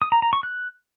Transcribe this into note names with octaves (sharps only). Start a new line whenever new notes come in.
D#6
A#5
A#5
C#6
F#6